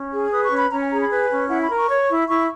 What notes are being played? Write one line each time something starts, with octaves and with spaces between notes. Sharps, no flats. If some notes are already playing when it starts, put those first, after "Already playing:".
Already playing: C#4
G#4
B4 D#6
C#6
C#4
B5
C#4 A#5
G#5
G#4 A#5
B5
B4 G#5
C#4
E4 F#5
B5
A#4
C#6
C#5
E4
E4 C#6